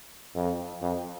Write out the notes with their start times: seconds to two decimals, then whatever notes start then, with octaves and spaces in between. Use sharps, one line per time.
0.35 F2
0.82 F2